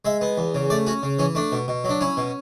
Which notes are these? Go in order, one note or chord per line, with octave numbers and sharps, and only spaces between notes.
G#3 E5
B3
E2
C#3
A3 D5
C#4 F#4
C#3
E3 C#4
A3 D4
B2
B2
F#3
D4
C#4 E4
B2